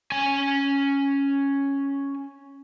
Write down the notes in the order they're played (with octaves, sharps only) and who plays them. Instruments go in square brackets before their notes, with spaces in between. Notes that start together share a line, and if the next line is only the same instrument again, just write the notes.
[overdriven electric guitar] C#4 G#5